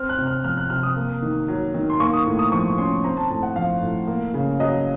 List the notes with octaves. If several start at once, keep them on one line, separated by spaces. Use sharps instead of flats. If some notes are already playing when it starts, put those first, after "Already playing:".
Already playing: C4 F6
F#6
C3
F6
F3 F6
F#6
C3 F6
D#6
A#3
D#3
F#3
D#3
C6
A#3 C#6
D#6
A2
D#6
F3 C#6
C#4 C6
C4 A#5
A5
A2 A5
F#5
F3 F5
A2
A#3
C#3
F#3 D#5